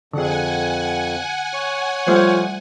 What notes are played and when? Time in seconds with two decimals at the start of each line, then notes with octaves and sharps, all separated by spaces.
0.13 F2 D3 G#4 F#5 G#5
1.54 C#5
2.07 F3 G3 A3 C5